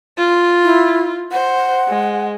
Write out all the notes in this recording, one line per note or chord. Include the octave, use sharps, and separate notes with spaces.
F4
E4
C5 F#5
G#3